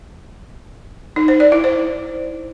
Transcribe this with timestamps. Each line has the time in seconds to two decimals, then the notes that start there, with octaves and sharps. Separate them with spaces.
1.16 D#4
1.28 C5
1.40 D5
1.52 E4
1.64 C5